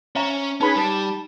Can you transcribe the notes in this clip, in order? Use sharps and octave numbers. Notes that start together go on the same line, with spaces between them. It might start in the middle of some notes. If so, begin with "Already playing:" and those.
C#4 C5 E5 A#5
C#4 D#4 G#4 B4 B5
G3 A5